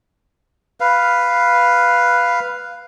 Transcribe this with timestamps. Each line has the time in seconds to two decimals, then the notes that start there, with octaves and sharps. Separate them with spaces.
0.80 B4 F5